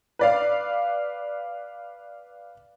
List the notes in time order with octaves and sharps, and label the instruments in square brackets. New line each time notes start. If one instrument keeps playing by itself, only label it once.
[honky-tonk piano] B4 D5 F5